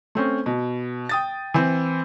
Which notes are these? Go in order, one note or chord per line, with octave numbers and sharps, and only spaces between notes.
A3 C4 C#4
B2
G5 D#6 A6
E3 C4